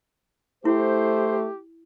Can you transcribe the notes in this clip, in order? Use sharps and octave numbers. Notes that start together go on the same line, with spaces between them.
A3 E4 G4 C5